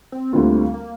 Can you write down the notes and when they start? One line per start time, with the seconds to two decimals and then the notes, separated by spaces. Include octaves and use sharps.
0.12 C4
0.32 D2 D3 G3 A#3 C4 F4
0.74 A#3